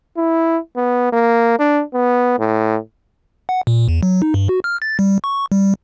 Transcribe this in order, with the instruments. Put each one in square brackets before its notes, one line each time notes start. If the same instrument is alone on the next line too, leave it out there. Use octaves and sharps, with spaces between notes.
[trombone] E4
B3
A#3
D4
B3
A2
[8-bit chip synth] F#5
A#2
E2
F#3
D#4
G2
F#4
F6
A6
G3
C#6
G3